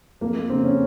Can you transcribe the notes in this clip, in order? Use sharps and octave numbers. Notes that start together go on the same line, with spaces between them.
F2 A#3
A#3
C#3 C4
C#4